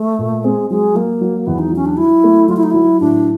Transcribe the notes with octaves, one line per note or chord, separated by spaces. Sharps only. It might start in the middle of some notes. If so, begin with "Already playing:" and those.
Already playing: A3
A#2
G#3 C4
F#3 G#3
F#3 A#3
F#3
E2 B3
D#4
F#3 C#4
D4
F#3 E4
A3
F#3 F4
E4
D#4
F#3 E4
A2 D4